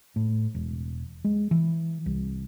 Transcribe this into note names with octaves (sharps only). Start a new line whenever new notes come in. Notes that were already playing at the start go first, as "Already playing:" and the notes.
A2
E1
G#3
E3
C2